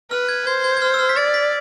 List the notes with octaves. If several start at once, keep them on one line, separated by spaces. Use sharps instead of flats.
B4 F6
G#6
C5 G#6
G#6
G#6
F6
E6
F6
B6
D5 A6
B6